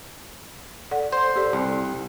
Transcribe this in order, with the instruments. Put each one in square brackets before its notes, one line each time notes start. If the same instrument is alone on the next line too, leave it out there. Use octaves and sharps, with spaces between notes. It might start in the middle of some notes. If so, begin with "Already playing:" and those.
[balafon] A4 D5 F#5
[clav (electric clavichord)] C5
[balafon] G4 A4 D5
[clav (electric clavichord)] C2